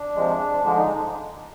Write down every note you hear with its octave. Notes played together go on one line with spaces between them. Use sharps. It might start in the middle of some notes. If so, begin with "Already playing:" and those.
Already playing: D4
C3 F3 G#3
D3 F3 G#3 D4
D#4